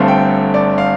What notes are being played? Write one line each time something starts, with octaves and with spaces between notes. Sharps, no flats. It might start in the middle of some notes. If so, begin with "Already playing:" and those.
Already playing: G1 G2 D3 A3 C4 F5
G5
D5
F5